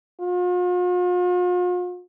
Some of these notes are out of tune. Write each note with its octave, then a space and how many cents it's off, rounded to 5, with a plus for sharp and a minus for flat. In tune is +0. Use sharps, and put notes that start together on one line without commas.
F4 +45